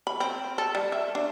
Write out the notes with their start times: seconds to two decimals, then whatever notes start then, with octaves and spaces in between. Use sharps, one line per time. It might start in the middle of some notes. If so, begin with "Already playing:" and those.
0.07 B5
0.20 C4
0.58 A4
0.75 G3
0.92 E5
1.15 D4